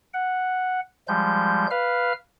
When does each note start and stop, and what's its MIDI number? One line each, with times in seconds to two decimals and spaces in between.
0.14 0.80 78
1.08 1.67 53
1.08 1.67 55
1.08 1.67 56
1.08 1.67 91
1.71 2.13 71
1.71 2.13 77
1.71 2.13 89